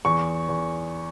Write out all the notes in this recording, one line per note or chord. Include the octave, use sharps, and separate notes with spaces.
E2 C#6
E2